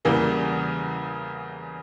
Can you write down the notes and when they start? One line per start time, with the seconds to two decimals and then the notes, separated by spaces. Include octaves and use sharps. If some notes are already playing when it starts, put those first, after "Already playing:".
0.05 E2 C#3 E3 G3 A#3